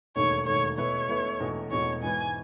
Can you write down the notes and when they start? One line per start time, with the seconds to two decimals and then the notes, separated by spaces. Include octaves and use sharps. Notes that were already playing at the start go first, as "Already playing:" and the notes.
0.16 E1 D#2 D#3 A3 C#5
0.46 E1 D#2 D#3 A3 C#5
0.78 B2 A3 E4 B4 C#5
1.09 B2 A3 E4 B4
1.40 E1 E2 B2 A3
1.71 E1 E2 B2 A3 C#5
2.02 G#2 E3 B3 G#5